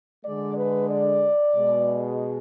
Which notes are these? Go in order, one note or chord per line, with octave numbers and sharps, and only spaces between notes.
D3 G#3 D5
B4
D5
B2 G#3